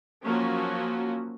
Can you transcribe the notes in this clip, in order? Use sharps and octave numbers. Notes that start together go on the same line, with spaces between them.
F3 F#3 A#3 C#4 F4 F#4